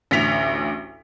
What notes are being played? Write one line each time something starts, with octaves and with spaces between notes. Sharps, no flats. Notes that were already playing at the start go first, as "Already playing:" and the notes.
A1 D2 B6 F7